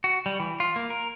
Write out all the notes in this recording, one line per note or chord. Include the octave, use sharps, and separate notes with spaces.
F#4
G3
E3
F4
A#3
A#4